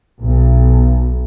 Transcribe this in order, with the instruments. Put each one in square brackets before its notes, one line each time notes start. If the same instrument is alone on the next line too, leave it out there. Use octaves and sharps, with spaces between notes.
[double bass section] B1